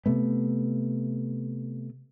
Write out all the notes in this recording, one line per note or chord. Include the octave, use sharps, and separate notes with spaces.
C3 A3 B3